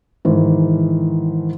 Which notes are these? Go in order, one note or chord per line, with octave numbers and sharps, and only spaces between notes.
G#2 D#3 E3